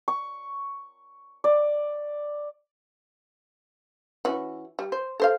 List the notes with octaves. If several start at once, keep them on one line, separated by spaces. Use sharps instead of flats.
C#6
D5
E3 C#4 F#4
G3
C5
A4 C5 F5